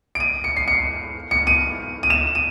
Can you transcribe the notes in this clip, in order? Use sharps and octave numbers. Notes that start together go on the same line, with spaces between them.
D7
D#7
C#7
C7
C#7
C#7
D#7
D#7
E7
D#7